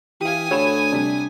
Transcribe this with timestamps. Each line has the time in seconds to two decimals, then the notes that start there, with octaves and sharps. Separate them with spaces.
0.21 E3 G4 F5 G#5 D#6
0.51 D2 F#4 A4 C#5 B5 E7
0.92 C3 G3 D4